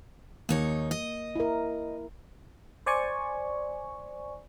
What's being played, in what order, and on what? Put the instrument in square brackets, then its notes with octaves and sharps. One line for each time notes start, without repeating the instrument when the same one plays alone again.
[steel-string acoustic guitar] D#2 D#4 C#5 [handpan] A#3
[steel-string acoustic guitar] D#5
[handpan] E4 A#4
[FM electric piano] C5 D5 G#5 C#6